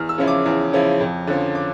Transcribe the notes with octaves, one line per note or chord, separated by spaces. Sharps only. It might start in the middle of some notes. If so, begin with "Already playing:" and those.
Already playing: E2 F6
E6
C#3 F3 C#4 E4
D6
E2
C#3 F3 C#4 E4
F2
D3 F3 C#4
D6